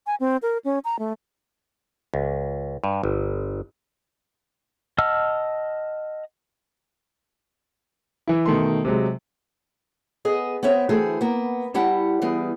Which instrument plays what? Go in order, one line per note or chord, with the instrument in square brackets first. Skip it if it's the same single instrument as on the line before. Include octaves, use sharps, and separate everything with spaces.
[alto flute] G#5
C4
A#4
C#4
A#5
A3
[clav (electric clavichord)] C#2
G2
G1
[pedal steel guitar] D#5 F#5 A5 E6 F6
[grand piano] E3 E4
B2 D#3 A3 C6
C3 F#3 G#3
[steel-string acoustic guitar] B3 G#4 D#5
B3 C4 C#5 E5
D3 E3 A3 C4 F#4 G#4
A#3 B3
G3 E4 G4 F#5 A5
E3 G3 B3 G#4